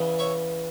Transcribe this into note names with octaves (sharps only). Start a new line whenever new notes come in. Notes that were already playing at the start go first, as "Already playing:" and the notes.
Already playing: E2 C#3 E3
C#5 E5